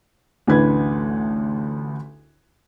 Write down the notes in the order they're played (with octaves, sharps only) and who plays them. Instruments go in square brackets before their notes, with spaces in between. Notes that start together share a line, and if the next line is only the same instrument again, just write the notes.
[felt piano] A1 D2 D4 B4 G#6